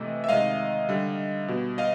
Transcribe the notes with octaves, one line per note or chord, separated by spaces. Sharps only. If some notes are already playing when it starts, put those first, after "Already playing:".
Already playing: C3 E3 A3 D#5
E5
C3 D#3 G#3 D#5 F5
D3 G3
B2 G3
D#5 F5